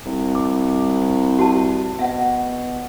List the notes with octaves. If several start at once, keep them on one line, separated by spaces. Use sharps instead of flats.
C2
D6
F#4 A5
B2 E5 F#5